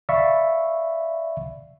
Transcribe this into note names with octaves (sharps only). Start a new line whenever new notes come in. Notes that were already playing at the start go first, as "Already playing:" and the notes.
D5 E5 F5 B5 C#6